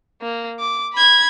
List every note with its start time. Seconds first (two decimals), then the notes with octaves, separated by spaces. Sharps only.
0.21 A#3
0.60 D6
0.94 B5 G#6